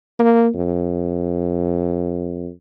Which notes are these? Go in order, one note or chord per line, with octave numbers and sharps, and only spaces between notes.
A#3
F2